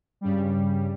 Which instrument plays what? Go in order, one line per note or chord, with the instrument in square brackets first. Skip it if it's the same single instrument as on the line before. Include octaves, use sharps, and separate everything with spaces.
[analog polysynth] G2 C#3 G3